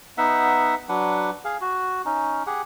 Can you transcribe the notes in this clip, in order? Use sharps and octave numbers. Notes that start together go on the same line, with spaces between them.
B3 D#4 E5 F#5
F#3 D4 B4 F#5
G#4 F5
F#4
C#4 D#4
G4 G#4 F#5